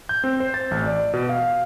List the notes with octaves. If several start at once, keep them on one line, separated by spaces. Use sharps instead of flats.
G6
C4
C5
A6
A1
D5
B2
F5